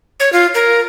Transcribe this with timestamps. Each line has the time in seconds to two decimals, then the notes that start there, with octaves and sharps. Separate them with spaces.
0.20 C#5
0.33 F4
0.55 A#4